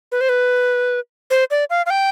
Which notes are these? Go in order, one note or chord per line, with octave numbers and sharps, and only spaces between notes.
B4
C5
B4
C5
D5
F5
F5
G5